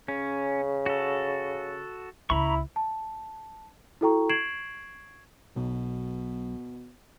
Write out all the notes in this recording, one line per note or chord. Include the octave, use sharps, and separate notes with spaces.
C#3 C#4
F#4 A4
C#2 E4 A#5 B5 C#6
A5
E4 F#4 A4 G5 A#5 C#6
C#6 G#6 C7 D7 E7 F#7
B1 B2